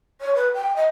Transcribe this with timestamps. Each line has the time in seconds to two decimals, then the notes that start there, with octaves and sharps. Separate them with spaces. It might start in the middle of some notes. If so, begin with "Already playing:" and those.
0.21 C#5
0.35 B4
0.54 G5
0.76 D#5